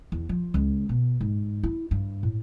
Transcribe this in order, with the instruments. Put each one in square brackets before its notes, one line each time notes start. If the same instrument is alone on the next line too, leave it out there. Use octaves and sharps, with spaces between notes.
[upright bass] E2
F3
C#2
B2
G#2
E4
G2
A2